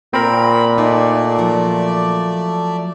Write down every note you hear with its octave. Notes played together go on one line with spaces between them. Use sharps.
A#2 C4 A#4 B5
A3 D#4 D5
F3 F#3